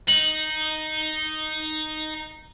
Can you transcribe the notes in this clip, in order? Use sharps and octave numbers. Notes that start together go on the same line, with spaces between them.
D#4 F#7